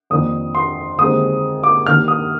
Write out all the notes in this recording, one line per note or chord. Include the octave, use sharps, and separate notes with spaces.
F2 D#3 A#3 D4 D#6
C6
D#2 D3 G#3 C4 D#6
D6
D#2 D#3 A#3 D4 F6
D#6